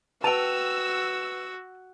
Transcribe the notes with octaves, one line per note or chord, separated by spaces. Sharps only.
F#4 B4 G5 A5 E6 D#7 F7